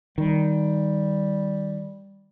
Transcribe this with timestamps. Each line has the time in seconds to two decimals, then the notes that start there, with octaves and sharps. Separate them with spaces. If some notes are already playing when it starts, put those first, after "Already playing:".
0.18 D#3 G3